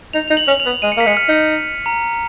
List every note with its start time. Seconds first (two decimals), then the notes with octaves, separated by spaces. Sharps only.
0.13 D#4 F7
0.28 D#4 F7
0.37 F#7
0.48 C#4
0.60 F7
0.66 B3
0.82 G#3 D#7
0.92 C#7
0.97 A#3 B6
1.06 G#3 C#7
1.17 F6
1.28 D#4
1.86 A#5